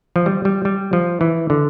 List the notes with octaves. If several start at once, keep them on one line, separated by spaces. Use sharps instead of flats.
F3
G3
G3
G3
F3
E3
D3